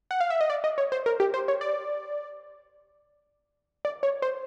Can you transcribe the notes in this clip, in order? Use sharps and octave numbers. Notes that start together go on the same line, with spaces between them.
F#5
F5
E5
D#5
D5
D#5
C#5
C5
A#4
G4
C5
C#5
D5
D5
C#5
C5